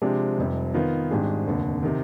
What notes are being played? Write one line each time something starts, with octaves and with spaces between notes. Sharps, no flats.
C3 F3 G#3 D4 G4
F1 F2 C3 G3
D#3 B3 F4
G#1 G#2 G3 D4 G#4
F1 D#2 D3
C3 D#3